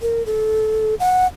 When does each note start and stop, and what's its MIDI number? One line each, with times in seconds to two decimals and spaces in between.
0.02 0.26 70
0.26 0.95 69
1.00 1.27 78